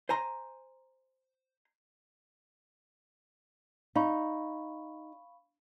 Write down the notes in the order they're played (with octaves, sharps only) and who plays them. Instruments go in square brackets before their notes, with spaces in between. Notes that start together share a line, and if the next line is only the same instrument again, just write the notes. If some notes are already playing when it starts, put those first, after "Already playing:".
[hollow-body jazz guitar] C5 G#5 A#5 C6
[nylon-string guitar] D#4 [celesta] F5 B5 C#6